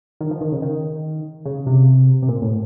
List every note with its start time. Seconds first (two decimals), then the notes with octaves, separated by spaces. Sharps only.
0.21 D#3
0.31 F3
0.41 D#3
0.52 C#3
0.62 D#3
1.45 C#3
1.66 C3
2.22 C3
2.28 A#2
2.42 A2